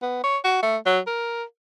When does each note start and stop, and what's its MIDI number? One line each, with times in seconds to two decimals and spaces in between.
0.02 0.22 59
0.23 0.37 73
0.44 0.58 66
0.63 0.77 57
0.86 0.99 54
1.07 1.44 70